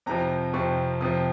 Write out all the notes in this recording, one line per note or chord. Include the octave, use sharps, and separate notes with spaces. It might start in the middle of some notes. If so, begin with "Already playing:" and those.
F2 C3 F3 A#5
F2 C3 F3 C#6
F2 C3 F3 D#6